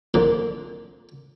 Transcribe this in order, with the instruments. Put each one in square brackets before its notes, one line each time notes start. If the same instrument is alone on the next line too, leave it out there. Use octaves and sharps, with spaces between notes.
[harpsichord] F2 A#2 D3 D#3 A#3